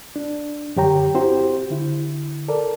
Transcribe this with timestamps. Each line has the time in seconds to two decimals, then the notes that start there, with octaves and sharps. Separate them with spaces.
0.16 D4
0.76 F#2 D3 G4 C#5 G5 A#5
1.14 C4 E4 F#4 G4 C5
1.70 D3 E4
2.48 A4 A#4 D5